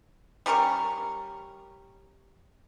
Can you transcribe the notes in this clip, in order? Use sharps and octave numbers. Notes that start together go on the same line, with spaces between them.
G3 C#4 A#4 C#6